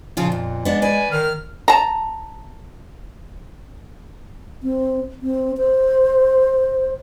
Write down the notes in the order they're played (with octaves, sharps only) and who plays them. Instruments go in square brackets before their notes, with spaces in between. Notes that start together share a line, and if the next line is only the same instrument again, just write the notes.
[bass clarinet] A#2 [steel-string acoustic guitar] C#3 F3 F4
[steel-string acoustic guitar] F2
[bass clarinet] G#3 [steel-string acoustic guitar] B3 D4
[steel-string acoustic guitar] B4 D5 [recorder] G#5
[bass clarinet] D#3 [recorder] F6
[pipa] A5 A#5
[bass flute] C4
C4
C5